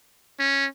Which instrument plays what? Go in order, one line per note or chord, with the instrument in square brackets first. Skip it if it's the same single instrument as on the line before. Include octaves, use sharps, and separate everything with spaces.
[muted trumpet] C#4